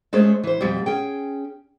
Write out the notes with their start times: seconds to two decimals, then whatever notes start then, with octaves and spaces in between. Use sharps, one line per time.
0.13 G#3 A3 C#4 G#4 C5
0.43 E3 C5
0.61 F2 B2 G3
0.86 C#4 G#4 G5